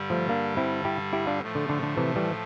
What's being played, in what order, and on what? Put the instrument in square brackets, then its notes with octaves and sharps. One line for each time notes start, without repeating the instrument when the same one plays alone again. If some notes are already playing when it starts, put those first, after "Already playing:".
Already playing: [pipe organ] G2 D3 G3
[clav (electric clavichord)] F3 A3
A#3 D4
C4 E4
E4 G4
E4 G4
D4 F4
[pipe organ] A2 F3 A3
[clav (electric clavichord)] D3
D3
D3
C3 E3
E3 G3